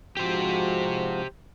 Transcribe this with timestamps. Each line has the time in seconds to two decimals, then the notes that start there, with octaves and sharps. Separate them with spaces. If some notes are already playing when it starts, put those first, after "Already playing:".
0.17 G#2 F3 F#4 G4 C5